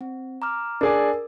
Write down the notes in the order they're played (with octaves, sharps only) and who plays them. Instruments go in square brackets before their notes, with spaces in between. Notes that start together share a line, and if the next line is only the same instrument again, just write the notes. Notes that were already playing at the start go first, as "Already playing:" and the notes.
[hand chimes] C4
A#5 D6 F6
[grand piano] D4 G#4 D5 [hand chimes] A#4